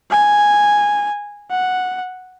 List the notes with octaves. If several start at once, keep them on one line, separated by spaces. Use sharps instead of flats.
G#5
F#5